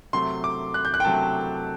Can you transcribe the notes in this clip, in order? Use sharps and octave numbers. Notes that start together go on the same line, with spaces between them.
C3 F#3 A3 C6
D6
F#6
G6
F#6
G5
C3 F#3 A3 A5